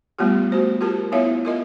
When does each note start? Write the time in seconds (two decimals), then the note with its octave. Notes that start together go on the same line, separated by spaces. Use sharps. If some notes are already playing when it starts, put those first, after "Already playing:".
0.19 G3 A3 B3 F4 G4
0.52 F#4 C5
0.81 F4 G4 A#4 A5
1.12 B3 E4 F4 C#5 E5 F5
1.45 F4 A#4 D#5